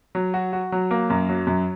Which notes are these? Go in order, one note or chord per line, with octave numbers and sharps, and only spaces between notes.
F#3
F#4
F#4
F#3
A#3
F#2
F#3
F#2